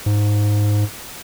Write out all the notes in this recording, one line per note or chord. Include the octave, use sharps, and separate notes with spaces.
G#2